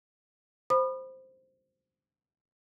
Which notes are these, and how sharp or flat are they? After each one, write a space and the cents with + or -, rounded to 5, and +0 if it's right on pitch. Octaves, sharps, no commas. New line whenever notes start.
C5 +0 B5 +0 D#6 -40